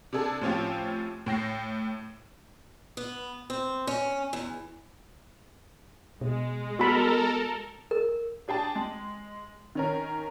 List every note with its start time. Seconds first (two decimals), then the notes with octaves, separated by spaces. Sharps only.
0.13 C3 D4 G#4 A4
0.41 A2 F3 C4 C#4 F4 G4
1.26 A2 G5 A#6 C7
2.97 B3
3.50 C4
3.87 C#4
4.33 E2
6.21 B2 G#3
6.79 B3 F#4 A4 A#4 B5
7.91 A#4
8.48 D4 G#4 G5 A5
8.75 G#3
9.75 D#3 C#4 A#4